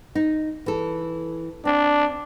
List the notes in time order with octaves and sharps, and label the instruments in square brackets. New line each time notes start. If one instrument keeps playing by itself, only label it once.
[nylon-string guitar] D#4
E3 A4
[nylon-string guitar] C4 [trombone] D4